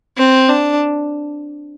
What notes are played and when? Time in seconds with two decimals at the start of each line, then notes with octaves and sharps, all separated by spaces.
0.17 C4
0.49 D4